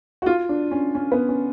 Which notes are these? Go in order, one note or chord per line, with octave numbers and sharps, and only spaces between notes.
F#4
F4
D4
C#4
C#4
B3
C#4